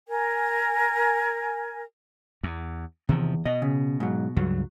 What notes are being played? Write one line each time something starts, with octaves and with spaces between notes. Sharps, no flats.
A#4 G#5
E2
E2 C3 D#3 F3
B2 D#5
C#3
G#2 F#3
C#2 G2 F#3